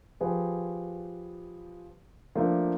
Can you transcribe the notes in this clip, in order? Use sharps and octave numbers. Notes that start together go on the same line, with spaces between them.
F3 G4 G#4 B4
F3 A3 A#3 D4